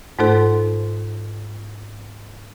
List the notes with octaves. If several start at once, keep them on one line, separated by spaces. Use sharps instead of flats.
G#2 A3 D#4 A4 C5